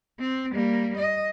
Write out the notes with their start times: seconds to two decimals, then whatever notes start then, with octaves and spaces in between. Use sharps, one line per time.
0.20 C4
0.52 G3 A#3
0.97 D#5